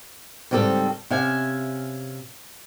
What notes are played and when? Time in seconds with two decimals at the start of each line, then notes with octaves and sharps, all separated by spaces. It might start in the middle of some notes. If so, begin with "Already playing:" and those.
0.51 G#2 C#3 G3 C4 A4
1.10 C3 C#4 E5 F5 G#5